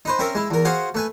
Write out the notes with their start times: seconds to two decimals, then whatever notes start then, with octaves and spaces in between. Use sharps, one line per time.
0.05 D#4 B4 C5
0.19 C4 C#4 A#4 E5
0.35 G#3 E4
0.50 E2 A#4
0.65 F#4 G#4 C5 F5 F#5
0.95 A3 B4 G#5